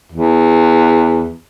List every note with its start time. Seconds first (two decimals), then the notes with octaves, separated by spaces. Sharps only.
0.12 E2